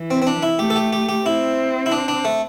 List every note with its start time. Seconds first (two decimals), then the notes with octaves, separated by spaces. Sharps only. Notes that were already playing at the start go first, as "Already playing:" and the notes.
Already playing: E3
0.11 C4
0.22 C4
0.27 D4
0.43 E4
0.59 A3 G4
0.70 A4
0.76 G4
0.93 G4
1.09 G4
1.25 C4 E4
1.86 E4
1.92 D4
2.08 D4
2.25 A3